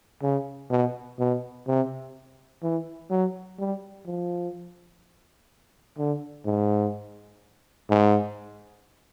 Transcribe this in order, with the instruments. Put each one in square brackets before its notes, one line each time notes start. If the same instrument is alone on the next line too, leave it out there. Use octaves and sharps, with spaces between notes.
[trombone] C#3
B2
B2
C3
E3
F#3
G3
F3
D3
G#2
G#2